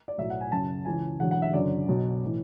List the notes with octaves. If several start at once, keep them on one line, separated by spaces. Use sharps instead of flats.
D5
B1 A2 F#3 E5
F#5
G#5
F#1 F#2 C#3 A5
C#2 C#3 E3 G#5
E1 E2 D3 F#3 F#5
F#5
E5
F#1 F#2 D3 F#3 D5
B1 B2 F#3
A2 E3